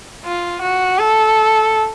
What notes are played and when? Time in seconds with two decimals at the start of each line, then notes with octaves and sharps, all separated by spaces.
0.25 F4
0.62 F#4
0.98 A4